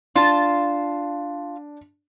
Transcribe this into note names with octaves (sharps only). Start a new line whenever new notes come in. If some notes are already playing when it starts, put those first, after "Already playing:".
D4 F4 A5